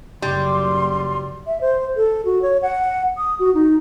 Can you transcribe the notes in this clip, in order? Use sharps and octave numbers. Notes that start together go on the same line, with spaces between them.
F#1 G3 C6
E5
C5
A4
F#4
C#5
F#5
D#6
F#4
D#4